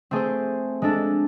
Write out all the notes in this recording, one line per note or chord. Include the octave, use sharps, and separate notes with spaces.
A3 C4 G#4 C5
G#3 D4 A4